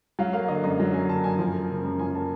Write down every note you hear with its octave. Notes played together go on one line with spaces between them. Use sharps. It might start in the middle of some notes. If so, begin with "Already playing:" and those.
F#3 F5
A#3 F5
D3 D#5
F#2 D#5
F#3
A#3 G#5
D3 A5
F#2 G#5
F3
A#3
C#3
F#2
F3 G#5
A#3 A5